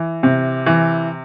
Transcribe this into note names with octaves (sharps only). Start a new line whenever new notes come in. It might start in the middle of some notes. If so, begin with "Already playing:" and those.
Already playing: E3
C3
E3